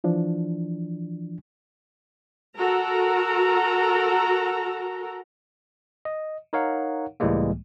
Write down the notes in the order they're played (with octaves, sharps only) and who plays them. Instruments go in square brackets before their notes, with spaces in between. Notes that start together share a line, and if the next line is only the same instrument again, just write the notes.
[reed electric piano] E3 F3 D4
[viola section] F#4 A4 A#4 A#5
[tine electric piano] D#5
D#4 A#4 C#5 F5 F#5
C#2 A2 E3 G3 G#3 A#3